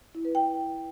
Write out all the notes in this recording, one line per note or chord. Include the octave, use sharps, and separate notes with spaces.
E4
B4
G5